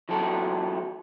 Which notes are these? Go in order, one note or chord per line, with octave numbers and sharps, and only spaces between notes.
E3 F#3 B3 A4